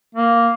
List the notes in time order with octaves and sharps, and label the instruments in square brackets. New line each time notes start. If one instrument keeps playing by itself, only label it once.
[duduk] A#3